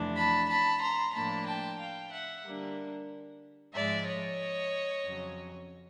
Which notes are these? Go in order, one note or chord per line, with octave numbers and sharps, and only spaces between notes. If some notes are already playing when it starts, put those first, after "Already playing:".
Already playing: F2 C3 E3 A3 D4
A5 B5
A5 B5
A#5 C6
A2 F3 A#3 D4 A5 B5
G5 A5
F5 G5
E5 F#5
D3 G3 A#3 D4
G#2 F3 G#3 D5 E5
C#5 D#5
F2 C#3 F#3